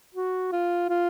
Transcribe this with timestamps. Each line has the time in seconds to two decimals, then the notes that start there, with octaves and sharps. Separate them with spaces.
0.15 F#4
0.52 F4
0.89 F4